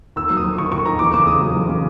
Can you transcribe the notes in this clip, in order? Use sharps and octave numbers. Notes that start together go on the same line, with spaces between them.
D#2 E6
F#3
D#6
D#2
D#2 C#6
D#2 C#6
D#2 A#5
E2 D6
C#3 D6
C#3 D#6
F#3
E2
C#3